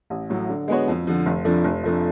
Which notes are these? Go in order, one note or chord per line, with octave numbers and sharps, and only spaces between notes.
A1
A2 F#3
D3
G#3 B3 F#4 C#5
F2
D3 F3
F1
F2 F3 A3 D4
F1
F2 F3 A3 D4